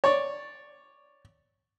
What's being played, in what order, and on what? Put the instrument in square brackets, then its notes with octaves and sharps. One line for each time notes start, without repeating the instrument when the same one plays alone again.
[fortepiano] C#5 D5